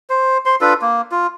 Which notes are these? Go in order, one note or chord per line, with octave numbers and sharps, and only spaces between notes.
C5
C5 C6
D4 F4 A4 B4
A#3
F4